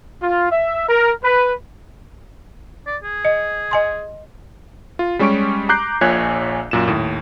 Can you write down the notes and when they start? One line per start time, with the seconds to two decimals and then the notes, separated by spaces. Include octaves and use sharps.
0.22 F4
0.51 E5
0.89 A#4
1.24 B4
2.87 D5
3.03 G#4
3.25 D#5
3.71 D#5 G#5 C6
4.99 F4
5.19 G3 G#3 C#4 G4 C#6 D7
5.69 A#5 D6 F#6 G6 C7
6.01 A#1 A#2 C#5 G#5 F#6 G#6
6.71 F#2 A#2 E7
6.88 D#2 A2